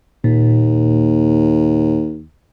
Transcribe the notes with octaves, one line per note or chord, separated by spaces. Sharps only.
D#2 A#2